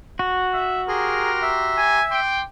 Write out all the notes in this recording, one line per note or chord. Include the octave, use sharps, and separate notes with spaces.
F#4
E5
G4 G#4 A#4 A#5 C6
E5
G#5
G5 C6 D6